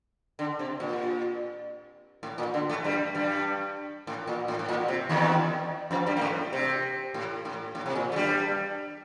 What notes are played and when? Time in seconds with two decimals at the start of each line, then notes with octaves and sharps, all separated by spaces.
0.39 D3
0.59 C3
0.80 A#2
2.23 A2
2.38 A#2
2.54 D3
2.69 A2 A3
2.84 G2 G3
3.15 G2 G3
4.07 A2
4.27 A#2
4.48 A2
4.59 A2
4.69 A#2
4.88 C3
5.09 D#2 D#3
5.91 F2 F3
6.07 G2 G3
6.17 A#3
6.21 A2 A3
6.53 C3
7.14 A2
7.45 A2
7.75 A2
7.86 C3
7.95 A#2
8.12 A3
8.16 G2 G3